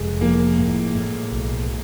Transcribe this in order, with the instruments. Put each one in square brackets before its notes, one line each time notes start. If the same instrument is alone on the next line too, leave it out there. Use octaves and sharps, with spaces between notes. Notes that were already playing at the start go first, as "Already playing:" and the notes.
Already playing: [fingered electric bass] F1 [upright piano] G#3
[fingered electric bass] F3 [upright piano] A#3
[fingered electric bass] A2
A2
B1